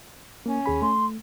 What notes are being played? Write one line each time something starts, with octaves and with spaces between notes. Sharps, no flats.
A#3 C#4
D#2 G#4 B5
A3 C6